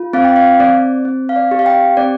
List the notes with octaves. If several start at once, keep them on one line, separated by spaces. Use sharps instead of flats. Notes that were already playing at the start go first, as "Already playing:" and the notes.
Already playing: F4
C4 F5
G5
F5
C4 D5
C4
F5
D5
G4
F5
G5
C4 D5